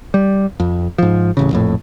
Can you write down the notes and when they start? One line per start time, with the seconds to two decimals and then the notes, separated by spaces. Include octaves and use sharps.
0.14 G3
0.60 F2
0.98 G#2 F3
1.37 D1 A1 C#3
1.51 A#1 F2 A2